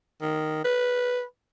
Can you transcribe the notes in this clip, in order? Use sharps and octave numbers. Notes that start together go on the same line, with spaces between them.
D#3
B4